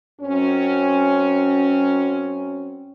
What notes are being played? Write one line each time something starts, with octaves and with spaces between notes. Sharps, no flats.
F#2 C4 C#4